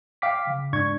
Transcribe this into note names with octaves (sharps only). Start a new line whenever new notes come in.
F5 G5 D6 B6
C#3
G#2 D4 C#6 G#6